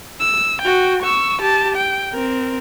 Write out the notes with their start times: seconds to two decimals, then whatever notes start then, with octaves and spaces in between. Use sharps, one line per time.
0.21 E6
0.62 F#4 G5
1.03 C#6 E6
1.42 G4 A5
1.76 G5
2.14 C4 A#4